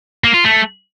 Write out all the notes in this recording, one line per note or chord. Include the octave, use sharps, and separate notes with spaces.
A#3
F4
A3